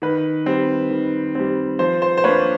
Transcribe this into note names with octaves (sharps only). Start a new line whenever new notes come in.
D#3 B4
G3 C4
D#3
G3 C4
F3 C5
C5
C5
A#3 D4 B4 C#5